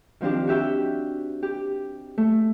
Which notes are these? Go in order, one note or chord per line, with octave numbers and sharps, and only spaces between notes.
D#3 F3 C4 D4 G4
F#4 G4 E5 G5
G4
A3